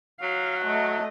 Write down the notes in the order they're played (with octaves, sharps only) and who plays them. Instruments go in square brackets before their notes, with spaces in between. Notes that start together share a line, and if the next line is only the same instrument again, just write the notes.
[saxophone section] F#3 [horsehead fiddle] F5
[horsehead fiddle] A3 D#5